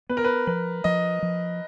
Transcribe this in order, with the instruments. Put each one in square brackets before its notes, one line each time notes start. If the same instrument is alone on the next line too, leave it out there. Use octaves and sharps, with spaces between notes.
[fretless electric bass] B3 [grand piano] B4
[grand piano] A#4
B4
[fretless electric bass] F3 [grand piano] B4
[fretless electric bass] F3 [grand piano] D#5
[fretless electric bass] F3